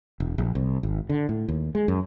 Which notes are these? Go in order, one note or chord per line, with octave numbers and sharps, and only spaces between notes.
E1
A#1
C2
G#1
D3
A2
D#2
G#3
F#2